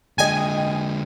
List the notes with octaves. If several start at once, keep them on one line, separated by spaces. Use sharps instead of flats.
D3 G#3 D#5 G5 G#5